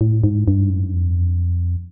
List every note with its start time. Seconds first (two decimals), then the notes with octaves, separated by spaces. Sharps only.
0.01 A2
0.24 G#2
0.48 G2
0.70 F#2
0.93 F2